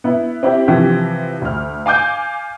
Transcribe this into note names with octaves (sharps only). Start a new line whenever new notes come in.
B3 E4
C4 E4 G4
C3 E3 F3 G4
D2 F6
F5 G#5 D6 G6